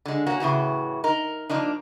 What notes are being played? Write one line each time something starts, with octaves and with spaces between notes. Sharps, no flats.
D3 G#3
A#3 C#4 F#4
A2 C#3 E3 F#4
D#4 A#4
F3 A#3 D4 D#4